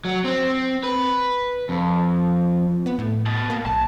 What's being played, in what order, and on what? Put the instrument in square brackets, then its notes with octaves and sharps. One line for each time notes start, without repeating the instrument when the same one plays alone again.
[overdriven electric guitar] F#3
C4
B4
F2
[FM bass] B3
A2
[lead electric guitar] B2
[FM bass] A#3
[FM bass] B1 [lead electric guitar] A5